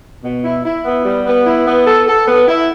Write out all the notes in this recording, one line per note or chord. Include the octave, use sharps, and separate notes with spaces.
B2
E4
E4
B3
G3
B3
E4
B3
A4
A4
B3
E4